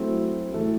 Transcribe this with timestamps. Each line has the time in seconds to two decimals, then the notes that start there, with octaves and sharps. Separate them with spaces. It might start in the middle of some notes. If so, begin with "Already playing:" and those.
Already playing: F#3 A3 C4 E4
0.52 A2 E3 A3